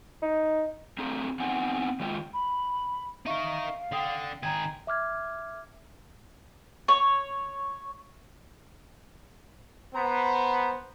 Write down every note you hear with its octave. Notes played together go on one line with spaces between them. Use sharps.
D#4
A3 C4 D4 G#4 A#5
B3 C4 D#4 F#5 G#5
D#3 G#3 F4 D#5 G5
B5
D#4 A#4 E5 F5 C#6
D3 G5 D#6 C7
D#3 G#4 G5 A#5 G#6
E5 D6 F6 G#6
C#5
B3 C5 A#5